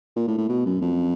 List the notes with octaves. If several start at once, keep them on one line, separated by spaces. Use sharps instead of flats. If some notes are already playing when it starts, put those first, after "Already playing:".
A#2
A2
A2
B2
F#2
F2